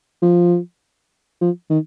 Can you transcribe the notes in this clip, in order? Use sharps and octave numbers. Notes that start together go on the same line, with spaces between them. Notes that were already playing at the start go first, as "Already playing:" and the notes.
F3
F3
D#3